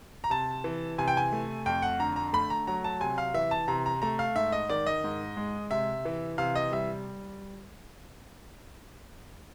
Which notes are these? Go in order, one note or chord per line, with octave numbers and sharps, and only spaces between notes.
A#5
C3 A5
E3
C3 G#5
G5
G#5
A3
F2 G5
F#5
D3 A#5
A#5
A3 B5
A#5
F#3 A#5
A5
C3 G#5
F5
E3 E5
A5
C3 A#5
A#5
A3 A#5
F5
G#2 E5
D#5
D#3 D5
D#5
G#2
G#3
C3 E5
E3
C3 F5
D#5
G3 E5